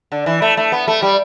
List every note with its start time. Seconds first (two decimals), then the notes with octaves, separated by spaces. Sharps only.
0.12 D3
0.26 E3
0.42 A3
0.57 A3
0.72 B3
0.88 A3
1.02 G3